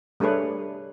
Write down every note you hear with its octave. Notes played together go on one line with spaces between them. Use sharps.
G3 A3 D4 G#4 B4 C#5